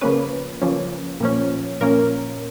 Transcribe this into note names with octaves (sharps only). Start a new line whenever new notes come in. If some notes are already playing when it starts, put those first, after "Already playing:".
C#3 F3 A#3 C#4 B4
C#3 F3 A#3 C#4
A#2 F3 A#3 C#4
A#2 F3 A#3 C#4 A#4